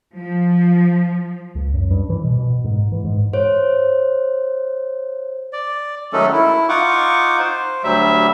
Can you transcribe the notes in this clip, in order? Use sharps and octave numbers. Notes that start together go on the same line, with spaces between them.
F3
C#2
F#2
G2
E3
B2
B2
G#2
E3
G#2
C5 C#5
D5
D#3 F#3 G#3 A3 C#4 A4
E4
D#4 F4 F#5 C#6 D6
C5
D2 F#3 G3 E5